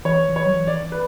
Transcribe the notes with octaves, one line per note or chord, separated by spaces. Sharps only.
E3 C#5
E3
C#5
F#3
E3
D5
B4